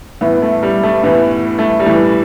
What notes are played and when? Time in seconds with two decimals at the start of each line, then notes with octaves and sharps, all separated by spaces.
0.21 A2 E3 B3
0.42 A3
0.63 G3
0.83 A3
1.04 A2 E3 B3
1.59 A3
1.80 G3
1.86 A2 E3 A3